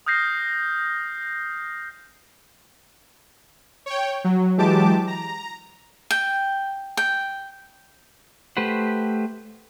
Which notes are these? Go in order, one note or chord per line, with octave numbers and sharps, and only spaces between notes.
D#6 F6 G6 A#6 C7
C#5 G5
F#3
E3 F#3 G#3 G4 A5 D6
A#5
G5
G5
A3 G4 B4 C5 F#5